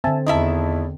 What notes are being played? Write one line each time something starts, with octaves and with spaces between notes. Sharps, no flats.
D3 C4 E5 G#5 A5
E2 D#3 E4 D#5 E5 A5